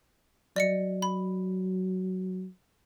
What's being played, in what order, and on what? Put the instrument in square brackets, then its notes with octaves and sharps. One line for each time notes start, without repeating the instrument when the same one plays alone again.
[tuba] F#3 [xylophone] D5 D#5 C#7
[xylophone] B5